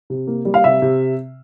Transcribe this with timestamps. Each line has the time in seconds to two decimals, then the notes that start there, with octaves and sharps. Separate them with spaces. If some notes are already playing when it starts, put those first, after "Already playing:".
0.10 C3
0.27 A#3
0.45 G3
0.54 F5
0.64 C3 E5
0.82 C3